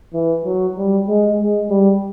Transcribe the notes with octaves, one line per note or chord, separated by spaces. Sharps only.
E3
F#3
G3
G#3
G#3
G3